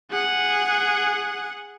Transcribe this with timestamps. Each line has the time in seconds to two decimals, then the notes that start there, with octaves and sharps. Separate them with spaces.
0.11 G#4 F#5